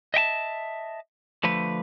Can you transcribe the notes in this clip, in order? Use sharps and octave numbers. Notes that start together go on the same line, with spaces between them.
D#5 E5 G5 A5
D3 F3 A3 B4